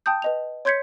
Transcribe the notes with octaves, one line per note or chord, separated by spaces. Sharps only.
G5 A5 D#6 G6
B4 D#5 F7
C#5 C6 G6 G#6 B6 C#7